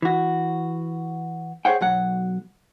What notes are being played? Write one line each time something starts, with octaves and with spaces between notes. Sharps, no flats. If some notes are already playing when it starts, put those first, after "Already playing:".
E3 F#4
G#4 C5 C#5 F#5 G5
B1 F#3 F#5